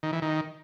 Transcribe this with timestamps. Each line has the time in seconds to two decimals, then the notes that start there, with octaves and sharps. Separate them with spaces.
0.03 D#3
0.13 E3
0.22 D#3